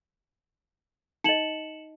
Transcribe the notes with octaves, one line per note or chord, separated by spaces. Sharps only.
D#4 D#5 C#7 E7 F#7